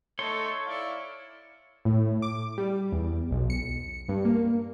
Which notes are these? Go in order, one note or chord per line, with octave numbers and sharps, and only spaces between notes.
A3 D#4 A4 C#5 C6
E4 D5 F5
A2
D6
G3
E2
B1
C#7
G2
A#3